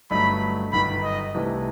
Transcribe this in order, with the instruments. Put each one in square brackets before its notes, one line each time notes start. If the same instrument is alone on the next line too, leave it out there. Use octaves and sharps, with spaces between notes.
[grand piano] G1 G2 F#3 A3 D#4 [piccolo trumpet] B5
[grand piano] G1 F#2 D#3 [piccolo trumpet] B5
[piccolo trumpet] D#5
[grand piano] C2 C3 E3 A3 D#4